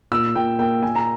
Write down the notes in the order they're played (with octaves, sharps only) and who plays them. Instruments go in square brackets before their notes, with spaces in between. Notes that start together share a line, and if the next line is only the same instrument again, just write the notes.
[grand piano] A#2 E6
A#2 G5
A#3 G5
A#2 G#5
A#5